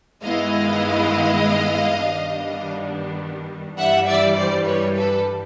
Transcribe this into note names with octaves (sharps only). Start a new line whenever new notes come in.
G2 D#3 G#3 B3 E4 D#5 F5
G2 D#3 G3 B3 D4
G2 E3 G3 E5 F#5
D5 E5
C5 D5
B4 C#5
A4 B4